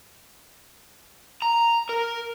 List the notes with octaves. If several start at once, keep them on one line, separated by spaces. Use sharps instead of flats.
A#5
A#4